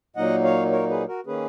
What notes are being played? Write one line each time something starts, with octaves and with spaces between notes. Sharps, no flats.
A#2 F#3 A#3 D#4 D#5 F#5
C#5 F5
A#4 C#5
G#4 B4
F#4 A#4
D#3 A#3 C#4 G#4 B4